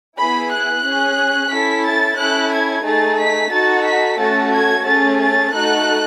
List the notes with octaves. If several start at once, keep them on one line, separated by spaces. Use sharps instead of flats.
B3 E4 G#4 B5
F#6
C#4 G#4
C#4 E4 A4 B6
A6
C#4 E4 A4 F#6
G#6
A3 D#4 G#4 A6
B6
D#4 F#4 A4 A6
B6
A3 C#4 F#4 A4 A6
G#6
A3 C#4 G#4 A6
A6
A3 D#4 F#4 A4 F#6